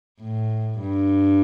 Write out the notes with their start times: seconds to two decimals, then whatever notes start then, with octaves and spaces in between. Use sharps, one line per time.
0.21 A2
0.80 G2